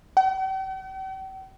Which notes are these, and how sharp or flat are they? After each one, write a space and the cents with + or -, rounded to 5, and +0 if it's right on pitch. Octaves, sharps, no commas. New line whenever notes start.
G5 -45